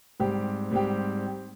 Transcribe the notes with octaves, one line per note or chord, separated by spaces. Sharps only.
G#2 G3 C4 G4
G#2 G3 C4 G4